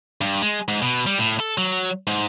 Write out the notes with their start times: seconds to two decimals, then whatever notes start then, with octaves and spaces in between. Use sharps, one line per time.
0.21 G2
0.42 G#3
0.68 G#2
0.82 B2
1.07 G3
1.18 A2
1.40 A4
1.58 F#3
2.07 G#2